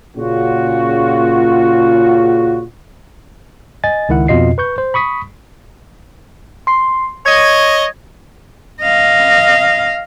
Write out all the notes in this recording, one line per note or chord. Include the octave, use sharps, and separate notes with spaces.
A#2 C#3 F4 F#4
D#5 G#5 A6
C#2 D#3 E4 F#5
F2 B2 F4 D#5 C7
B4 C#6 G6
C5
B5 C#6 D#6 B6
C6 C7
C#5 D#5 G#6
D#5 F5